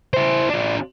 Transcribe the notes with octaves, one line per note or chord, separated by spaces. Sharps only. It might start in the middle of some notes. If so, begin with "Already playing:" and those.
E4 C5
D4 F4